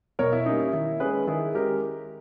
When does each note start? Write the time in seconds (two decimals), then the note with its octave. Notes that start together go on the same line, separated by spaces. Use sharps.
0.19 B2 A#4 C#5
0.32 E4
0.46 G3 A#3 C#4 D#4
0.59 E4
0.73 D#3 E4
1.00 G#3 C#4 G#4 B4
1.27 D#3 E4 G#4
1.55 G#3 C#4 G4 A#4